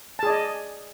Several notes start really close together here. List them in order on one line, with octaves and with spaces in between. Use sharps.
A5 G#4 D5 D#5